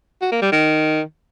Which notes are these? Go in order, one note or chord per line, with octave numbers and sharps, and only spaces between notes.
F#4
A#3
G3
D#3